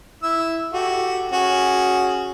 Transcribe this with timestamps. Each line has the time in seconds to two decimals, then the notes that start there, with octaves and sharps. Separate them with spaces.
0.23 E4 E6
0.73 F#4 G4 A4
1.32 C#4 F#4 G#4